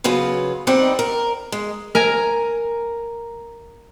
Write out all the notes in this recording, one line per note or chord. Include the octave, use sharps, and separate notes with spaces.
C#3 F#3 B3 F4
G3 C4 D#4 D5 F#5
A#4
G#3
A#4 G#5 A#5